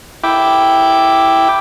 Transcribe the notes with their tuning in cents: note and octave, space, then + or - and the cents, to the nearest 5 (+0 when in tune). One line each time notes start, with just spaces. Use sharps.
E4 +0 G5 +0 D6 +0